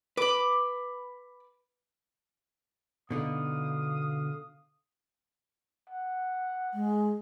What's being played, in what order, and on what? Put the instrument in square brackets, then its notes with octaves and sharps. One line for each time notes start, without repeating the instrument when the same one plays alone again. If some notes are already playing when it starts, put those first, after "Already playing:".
[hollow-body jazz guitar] B4 [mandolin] B5 D6
[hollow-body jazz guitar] B2 D3 D#4 [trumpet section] F5 D#6
[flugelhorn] F#5
[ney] G#3